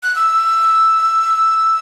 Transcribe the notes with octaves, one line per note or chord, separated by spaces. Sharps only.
F#6
E6